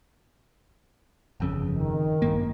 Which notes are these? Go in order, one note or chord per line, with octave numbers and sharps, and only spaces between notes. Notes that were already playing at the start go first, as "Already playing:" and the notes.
G1 F2 C#3
D#3
A#1 G2 A#3